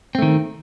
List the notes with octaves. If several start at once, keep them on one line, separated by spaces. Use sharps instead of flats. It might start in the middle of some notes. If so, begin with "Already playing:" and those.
D#3 A3 C4